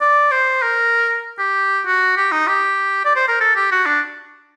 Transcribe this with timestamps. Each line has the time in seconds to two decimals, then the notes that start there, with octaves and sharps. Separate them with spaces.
0.01 D5
0.31 C5
0.62 A#4
1.39 G4
1.86 F#4
2.17 G4
2.31 D#4
2.47 G4
3.05 D5
3.16 C5
3.28 A#4
3.40 A4
3.55 G4
3.71 F#4
3.86 D4